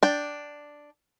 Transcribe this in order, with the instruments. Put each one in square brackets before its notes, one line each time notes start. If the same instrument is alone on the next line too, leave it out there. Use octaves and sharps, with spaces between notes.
[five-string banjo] D4 G5